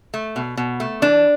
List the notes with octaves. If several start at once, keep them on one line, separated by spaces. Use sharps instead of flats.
A3
B2
B2
A3
E3 D4